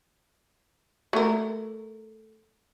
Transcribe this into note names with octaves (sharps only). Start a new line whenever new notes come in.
A3 A#4